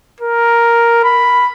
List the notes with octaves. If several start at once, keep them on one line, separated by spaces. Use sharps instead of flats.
A#4
B5